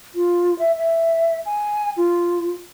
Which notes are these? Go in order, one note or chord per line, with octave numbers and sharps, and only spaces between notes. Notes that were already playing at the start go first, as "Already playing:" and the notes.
F4
E5
E5
G#5
F4